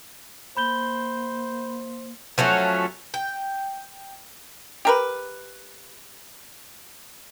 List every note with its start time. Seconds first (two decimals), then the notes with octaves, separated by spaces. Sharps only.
0.57 A#3 C5 B5 G6 G7
2.38 F3 F#3 A3 C#4
3.14 G5
4.85 G4 A#4 B4